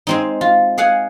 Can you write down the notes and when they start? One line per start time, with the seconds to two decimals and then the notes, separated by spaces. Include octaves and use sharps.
0.07 G#3 C4 D#4
0.41 F4
0.78 G#4 F5 F#5 G#5